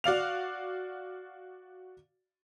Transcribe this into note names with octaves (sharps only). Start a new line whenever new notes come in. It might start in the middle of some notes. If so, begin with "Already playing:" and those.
F#4 D5 F5 F7